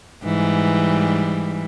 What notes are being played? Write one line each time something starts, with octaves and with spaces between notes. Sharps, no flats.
G#2 E3 G3